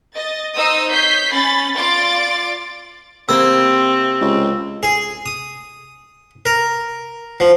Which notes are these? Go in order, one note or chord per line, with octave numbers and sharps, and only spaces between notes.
D#5 A6
D#4 C5 D#5 D#6 E6
C#5 G6 B6 C7
C#4 B5 A6
F4 D5 C6 D6 A6
C3 A#3 C4 E4 E6
C#2
G#4
D#6
A#4
F3